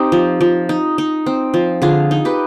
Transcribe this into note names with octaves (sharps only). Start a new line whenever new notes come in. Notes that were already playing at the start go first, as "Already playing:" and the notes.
Already playing: C4 D#4 G4
F3
F3
D#4
D#4
C4
F3
D3 F4 G#4
D#4
G4 B4